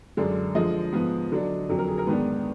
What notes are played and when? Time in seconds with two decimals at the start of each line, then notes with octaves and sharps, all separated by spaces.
0.17 F#2 D3 G#3 D4
0.55 D3 F3 G#3 D#5
0.93 G#2 F3 B3
1.32 D3 F#3 D4
1.69 F2 D3 F#3
1.78 A#4
1.88 G#4
1.98 A#4
2.07 G#2 D#3 G#3 B3 D4 B4